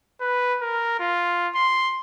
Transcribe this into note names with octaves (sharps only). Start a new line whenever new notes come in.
B4
A#4
F4
C6